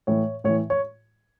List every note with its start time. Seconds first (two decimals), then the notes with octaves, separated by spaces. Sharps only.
0.07 A2 E3 C#5
0.44 A2 C#5
0.49 E3
0.70 C#5